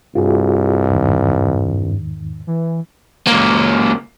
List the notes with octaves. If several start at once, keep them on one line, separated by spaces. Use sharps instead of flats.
C2 G2 F4 F#4 G#4
E2 G#2 D#3
E3
C#2 A#3